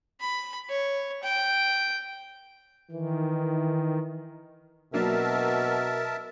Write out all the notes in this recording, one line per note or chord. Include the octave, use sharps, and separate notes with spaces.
B5
C#5
G5
D#3 E3
B2 F#3 A#3 D4 A#4 E5 A5